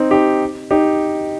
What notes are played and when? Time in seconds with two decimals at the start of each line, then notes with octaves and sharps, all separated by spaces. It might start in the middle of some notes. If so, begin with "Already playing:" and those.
Already playing: C4 D#4
0.11 D#4 G4
0.71 D#4 G4